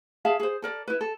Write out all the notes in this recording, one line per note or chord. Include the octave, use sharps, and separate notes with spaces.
G#4 E5 F5 A5
G#4 C5
A4 A#4 D5
E4 B4
A4